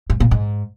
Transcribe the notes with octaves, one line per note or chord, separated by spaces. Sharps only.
G#2
A#2
G#2